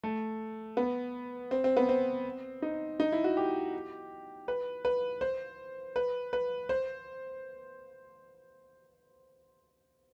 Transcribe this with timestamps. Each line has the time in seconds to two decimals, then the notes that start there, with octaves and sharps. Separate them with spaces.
0.04 A3
0.77 B3
1.51 C4
1.64 C4
1.77 B3
1.89 C4
2.62 D#4
3.00 D#4
3.12 E4
3.24 F#4
3.37 G4
4.48 B4
4.85 B4
5.21 C5
5.96 B4
6.33 B4
6.69 C5